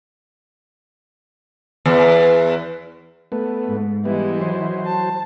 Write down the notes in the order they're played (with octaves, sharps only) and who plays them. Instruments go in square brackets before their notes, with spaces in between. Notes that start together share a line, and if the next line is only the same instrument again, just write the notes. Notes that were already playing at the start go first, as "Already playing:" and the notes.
[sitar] E2
[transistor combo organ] A3 B3
[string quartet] G#2
[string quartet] E3 G#3 E4 [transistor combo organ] G3 B3
[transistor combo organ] F#3 C5
[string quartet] A5